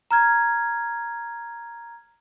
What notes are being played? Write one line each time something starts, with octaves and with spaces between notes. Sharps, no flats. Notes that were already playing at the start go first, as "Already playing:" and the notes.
A#5 F6 G#6